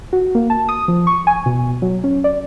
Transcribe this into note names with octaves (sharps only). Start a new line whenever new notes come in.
F#4
A#3
A5
D#6
F3
C#6
G#5
B2
F#3
C#4
D5